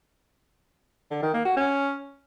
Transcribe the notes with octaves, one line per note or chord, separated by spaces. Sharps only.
D3
D#3
A#3
F#4
C#4